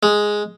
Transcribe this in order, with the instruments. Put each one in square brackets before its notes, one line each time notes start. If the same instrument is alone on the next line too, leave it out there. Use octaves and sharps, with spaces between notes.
[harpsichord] G#3